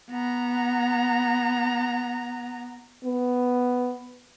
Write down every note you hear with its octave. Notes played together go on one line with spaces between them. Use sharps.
B3 A#5
B3